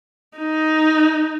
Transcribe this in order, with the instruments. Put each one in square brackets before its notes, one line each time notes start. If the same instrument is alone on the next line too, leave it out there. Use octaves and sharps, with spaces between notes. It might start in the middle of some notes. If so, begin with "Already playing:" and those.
[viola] D#4